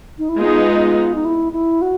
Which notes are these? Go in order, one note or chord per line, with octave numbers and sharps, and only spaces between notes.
D#4
E4
G#3 B3 D#4 F4
D#4
E4
E4
F#4